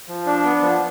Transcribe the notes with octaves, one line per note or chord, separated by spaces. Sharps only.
F3
D4
B3
F3